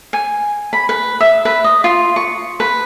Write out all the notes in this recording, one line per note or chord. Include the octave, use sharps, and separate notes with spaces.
G#5
B5
B4
E5
B4
D#5
F4
C#6
B4